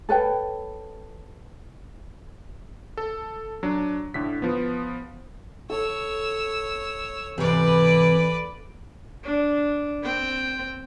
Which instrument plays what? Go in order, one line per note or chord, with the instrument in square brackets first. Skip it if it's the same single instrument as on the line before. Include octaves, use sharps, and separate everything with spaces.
[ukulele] A4 B4 C#5 G5
[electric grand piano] A4
F#3 D4
A2 D3 B6
F3 B3
[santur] A4 [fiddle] C#5 E6
[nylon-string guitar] G#2 C3 [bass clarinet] E3 [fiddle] B4 D5
[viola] D4
C4 G5